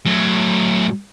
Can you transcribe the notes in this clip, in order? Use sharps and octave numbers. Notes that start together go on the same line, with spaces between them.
A2 F#3